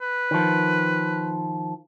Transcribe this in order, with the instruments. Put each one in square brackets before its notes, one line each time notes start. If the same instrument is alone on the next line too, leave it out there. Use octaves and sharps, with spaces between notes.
[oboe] B4
[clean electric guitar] D#3 F3